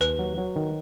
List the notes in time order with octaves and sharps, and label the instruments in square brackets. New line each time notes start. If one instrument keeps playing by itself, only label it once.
[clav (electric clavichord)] D#2 [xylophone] B4
[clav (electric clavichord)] F#3
F#3
D#3